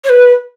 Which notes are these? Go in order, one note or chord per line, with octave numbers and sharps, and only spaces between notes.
C#5
B4